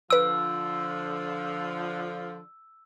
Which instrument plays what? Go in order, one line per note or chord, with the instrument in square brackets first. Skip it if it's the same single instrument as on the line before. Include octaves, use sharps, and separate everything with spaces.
[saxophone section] D3 F3 [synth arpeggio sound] B4 D7 [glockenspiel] E6